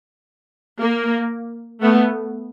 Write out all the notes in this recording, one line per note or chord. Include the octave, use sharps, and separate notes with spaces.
A#3
A3 B3